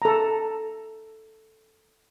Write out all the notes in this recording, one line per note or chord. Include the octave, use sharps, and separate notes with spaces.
A4 A#5